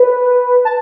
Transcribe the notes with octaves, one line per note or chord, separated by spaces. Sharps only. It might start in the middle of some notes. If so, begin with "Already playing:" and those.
Already playing: B4
A5